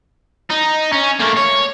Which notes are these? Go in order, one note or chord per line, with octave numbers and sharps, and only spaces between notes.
D#4
C#4
A3 A#3
C#5